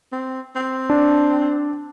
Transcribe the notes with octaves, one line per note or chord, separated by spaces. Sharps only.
C4
C4
D4